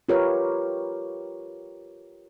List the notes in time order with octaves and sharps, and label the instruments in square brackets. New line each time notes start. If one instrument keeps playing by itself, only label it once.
[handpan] F4 G4 A#4 B4 C#5